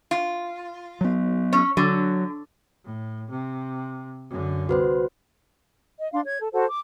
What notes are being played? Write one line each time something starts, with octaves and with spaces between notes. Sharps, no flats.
F4
F#3 B3
C#4 C#5
D3 F#3
A2
C3
F#2 D3
C2 F#4 B4 C5
D#5
D4 F5 C6
C#5 G#6
A4
F#4 A4 C5 F#5
D6